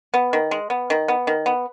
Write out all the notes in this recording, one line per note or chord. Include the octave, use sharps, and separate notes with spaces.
B3
D#3
G#3
B3
D#3
B3
D#3
B3